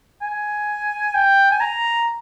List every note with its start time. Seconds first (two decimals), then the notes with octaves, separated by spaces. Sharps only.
0.22 G#5
1.15 G5
1.51 G#5
1.61 A#5